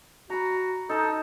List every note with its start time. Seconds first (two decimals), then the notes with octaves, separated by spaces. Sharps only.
0.30 F#4 A#5 B5
0.89 D#4 A4 A5